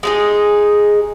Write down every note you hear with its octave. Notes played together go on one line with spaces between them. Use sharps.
G#3 D#4 G#4